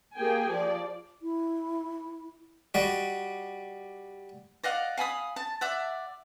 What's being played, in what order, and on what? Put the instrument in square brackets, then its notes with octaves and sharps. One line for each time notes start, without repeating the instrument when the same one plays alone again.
[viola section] A#3 G4 G#4 G5 G#5
F3 D5
[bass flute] E4
[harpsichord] G3 F#4 D#5
[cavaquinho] D5 D#5 F5 F#5
F5 G#5 B5 D#6
A5
D5 E5 F#5